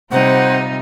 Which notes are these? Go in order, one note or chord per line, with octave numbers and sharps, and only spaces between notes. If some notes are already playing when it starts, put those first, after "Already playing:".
C3 G3 D#4 F4 C5 F#5